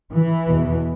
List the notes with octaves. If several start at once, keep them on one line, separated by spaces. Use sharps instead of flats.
E3
E2 B2